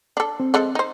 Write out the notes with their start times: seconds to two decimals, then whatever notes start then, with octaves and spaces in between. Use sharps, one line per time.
0.17 D4 A4
0.40 C4
0.54 F3 G#3 A4
0.75 D#4 C5